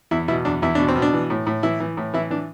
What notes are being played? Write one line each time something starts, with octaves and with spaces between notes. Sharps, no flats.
E2 E4
B2 E4
E2 D4
E2 E4
B2 D4
C4
B2
D4
E3
A2
A2
E3 E4
E3
A2
E3 E4
E3 D4